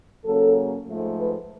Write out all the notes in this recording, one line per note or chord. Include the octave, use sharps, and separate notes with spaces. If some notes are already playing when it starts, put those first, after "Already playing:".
C#3 F#3 A#3 C#4 A4
G#2 F3 A3
B4